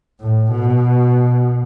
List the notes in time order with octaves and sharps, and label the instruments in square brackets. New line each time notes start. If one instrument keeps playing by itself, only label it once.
[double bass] A2
B2